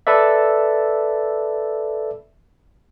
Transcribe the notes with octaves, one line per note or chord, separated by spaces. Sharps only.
A4 B4 D5 E5